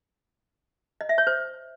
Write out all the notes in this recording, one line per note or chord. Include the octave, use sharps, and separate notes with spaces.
D#5
E5
C#5
C5